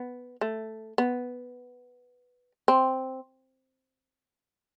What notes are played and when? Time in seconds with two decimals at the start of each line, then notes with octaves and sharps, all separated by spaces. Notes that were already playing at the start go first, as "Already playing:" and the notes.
Already playing: B3
0.41 A3
0.98 B3
2.68 C4